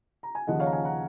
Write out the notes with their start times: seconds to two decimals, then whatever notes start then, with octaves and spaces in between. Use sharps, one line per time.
0.23 A#5
0.35 G#5
0.47 D#2 C#3 F3 D#5 F#5
0.60 C#5 F5
0.66 A#5
0.72 F5 G#5
0.84 F#5 A#5